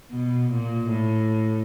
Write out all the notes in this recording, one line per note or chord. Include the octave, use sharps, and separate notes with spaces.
B2
A#2
A2